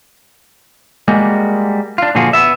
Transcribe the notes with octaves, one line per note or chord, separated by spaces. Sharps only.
G3 G#3 A#3 F#4
D4 F4
A#2 D3 F3 F4 F#4 G#4
B3 E5